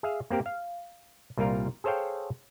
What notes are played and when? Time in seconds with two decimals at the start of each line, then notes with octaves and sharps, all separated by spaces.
0.03 G#4 E5 F5
0.30 A#3 C4 G4 A#4
0.46 F5
1.37 C2 A#2 G3 F4 A#4 F5
1.84 G#4 A4 C5 C#5 F5 G5